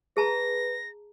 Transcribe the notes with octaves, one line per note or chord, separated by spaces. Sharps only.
G#4 B4 A5 A#5 A#6